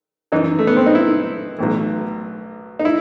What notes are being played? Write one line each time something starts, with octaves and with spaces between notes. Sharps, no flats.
F#2 E3 D#4
A3
B3
C4
D#4
E4
B1 A2 E3
D#4
E4